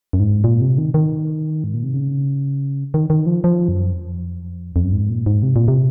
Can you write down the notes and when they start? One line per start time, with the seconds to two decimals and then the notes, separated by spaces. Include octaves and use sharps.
0.13 F#2
0.20 G#2
0.44 A#2
0.61 C3
0.78 D#3
0.94 D#3
1.64 G#2
1.74 A#2
1.84 C3
1.94 C#3
2.94 D#3
3.10 D#3
3.26 F3
3.44 F3
3.68 F#2
3.93 F2
4.76 F2
4.84 F#2
4.92 G#2
5.10 A#2
5.26 G#2
5.43 C3
5.56 A#2
5.68 C3